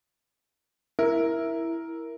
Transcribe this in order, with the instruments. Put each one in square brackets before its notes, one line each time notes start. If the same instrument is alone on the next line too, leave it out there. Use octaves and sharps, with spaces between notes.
[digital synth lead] E4 [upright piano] A#4